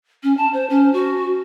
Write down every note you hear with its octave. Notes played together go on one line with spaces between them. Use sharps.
C#4
A5
C5
C#4
F#4